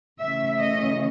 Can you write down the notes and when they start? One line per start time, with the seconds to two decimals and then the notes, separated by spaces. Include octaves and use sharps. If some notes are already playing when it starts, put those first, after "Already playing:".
0.19 C#3 E3 A3 C#4 E5
0.60 D#5